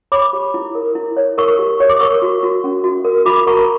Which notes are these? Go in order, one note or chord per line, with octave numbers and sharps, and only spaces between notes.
C#5 B5 D6
G4
E4
A#4
E4
C#5
A#4 C#6 E6
G4
C#5
D6
A#4 C#6 E6
F#4
F#4
C#4
F#4
A#4
F#4 B5 D6
A#4 A#5 C#6